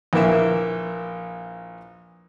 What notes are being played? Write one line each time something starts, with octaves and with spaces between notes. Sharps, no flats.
A#1 E3 A#3 E5